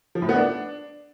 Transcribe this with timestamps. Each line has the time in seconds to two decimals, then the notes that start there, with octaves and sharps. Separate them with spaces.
0.15 F3
0.22 A2
0.29 B3
0.36 D4